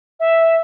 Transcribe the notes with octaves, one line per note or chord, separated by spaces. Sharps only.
E5